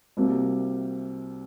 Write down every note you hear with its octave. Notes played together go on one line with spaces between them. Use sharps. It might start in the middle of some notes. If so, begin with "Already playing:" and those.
C2 C3 G3 A#3 F#4